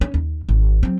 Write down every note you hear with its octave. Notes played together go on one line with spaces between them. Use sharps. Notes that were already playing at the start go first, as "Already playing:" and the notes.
C#4
D#2
G#1
F#3 C4